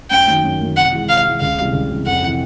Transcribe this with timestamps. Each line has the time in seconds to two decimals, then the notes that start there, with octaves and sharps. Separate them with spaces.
0.11 F#2 G5
0.27 D#3 F#3 A#3
0.44 F#2
0.60 D#3 F#3 A#3
0.76 C3 F#5
0.92 E3 G#3
1.09 C3 F5
1.25 E3 G#3
1.40 C#2 F5
1.58 C3 E3 G3
1.73 C#2
1.89 C3 E3 G3
2.06 F2 F#5
2.23 C3 E3